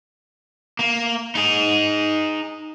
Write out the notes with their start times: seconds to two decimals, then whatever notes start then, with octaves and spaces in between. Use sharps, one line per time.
0.79 A#3
1.35 D#4 G#4